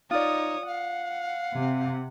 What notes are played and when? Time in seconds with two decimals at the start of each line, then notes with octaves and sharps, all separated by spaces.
0.11 D#4 F4 C#5 D5 D#6
0.67 F5 F#5
1.57 C3